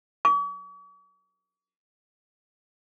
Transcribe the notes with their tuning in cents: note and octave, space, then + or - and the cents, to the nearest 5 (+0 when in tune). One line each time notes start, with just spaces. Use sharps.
C#6 +45